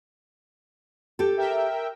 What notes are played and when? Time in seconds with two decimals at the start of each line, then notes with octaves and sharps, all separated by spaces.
1.19 G4 A4
1.37 A#4 E5 G5